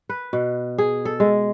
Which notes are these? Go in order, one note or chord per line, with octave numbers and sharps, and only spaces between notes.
B4
B2
G#4
A4
G#3